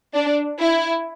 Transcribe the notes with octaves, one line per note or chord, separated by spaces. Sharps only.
D4
E4